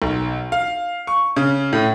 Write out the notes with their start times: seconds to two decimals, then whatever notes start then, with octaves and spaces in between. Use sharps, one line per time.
0.02 B1
0.52 F5
1.07 C#6
1.36 C#3
1.73 A2